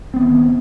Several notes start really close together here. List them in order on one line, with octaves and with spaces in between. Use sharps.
C4 B3 D#3